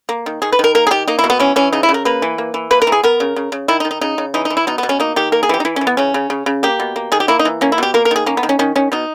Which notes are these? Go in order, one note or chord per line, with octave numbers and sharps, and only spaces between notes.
A#3
D#3
D#3 G#4
B4
D#3 A#4
A#3 A#4
G#4
D#3 G4
A#3 D#4
E4
B2
B3
E3 C#4
E3 C#4
C#3 D#4
E4
C#3
A#4
A#3 B4
E3
A#3
E3
A#3 B4
A#4
E3
G#4
B3 A#4
C#3
C#3
C#3
D#3 E4
D#4
D#3
D#4
C#3 D#4
C#3
E3 D#4
D#4
E3
E4
B2 D#4
B3
B2
C#4
A#3 D#4
D#3 G4
A#3 A#4
G#4
E3 G4
D#4
E3 E4
C#4
E3
B3
C#3 C#4
C#3
C#3
C#3
A#3 G4
B2
A#3
D#3 G#4
G4
A#3 E4
D#4
E3
A#3 C#4
E4
B2 G4
A#3 A#4
A#4
D#3 G#4
A#3 C#4
B3
D#3
C#4
D#3 C#4
D#3 C#4
B2 D#4